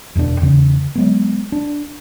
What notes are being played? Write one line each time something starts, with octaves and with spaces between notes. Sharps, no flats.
E1 E2 B2 D4
E2 C#3
F#3 G#3 B3
D4